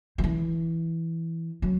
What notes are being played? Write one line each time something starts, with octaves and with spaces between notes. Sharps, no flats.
F3
E3
F#3